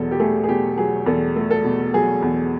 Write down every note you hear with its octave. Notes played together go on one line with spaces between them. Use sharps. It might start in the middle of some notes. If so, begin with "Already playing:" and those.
Already playing: E2 B2 F#3 A4
G4
A3 G#4
G#4
B2 G4
F#3 G#4
E2 A4
A3
A4
B2
F#3 G#4
E2